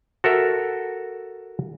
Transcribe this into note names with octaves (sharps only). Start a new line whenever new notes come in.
F#4 A4 A#4 E5